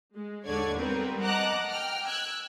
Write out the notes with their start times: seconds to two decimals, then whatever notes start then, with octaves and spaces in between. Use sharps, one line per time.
0.15 G#3
0.45 D#2 G#2 D3 C#5 D5 G#6
0.78 G3 B3 C4 A#4 B4
1.21 D#5 F#5 A5 A#5 D6 F#6
1.70 G5 F6
2.07 E6 F#6 G#6